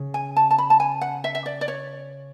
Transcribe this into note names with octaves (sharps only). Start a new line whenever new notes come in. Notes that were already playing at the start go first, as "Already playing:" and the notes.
Already playing: C#3
G#5
A5
A5
B5
A5
G#5
F#5
E5
E5
D5
D5
C#5